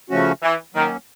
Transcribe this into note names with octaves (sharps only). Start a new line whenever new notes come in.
C#3 F3 A3 C#4 F#4
E3
D#3 F#3 A#3 C#4